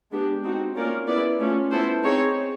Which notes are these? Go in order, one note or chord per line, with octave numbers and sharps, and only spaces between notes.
G#3 B3 D4 G4
C4 D#4 F#4
A#3 C#4 F4 A#4 D5
B3 E4 G#4 B4 D5
A3 C#4 F4
B3 E4 A4 C5
C4 D#4 G#4 C#5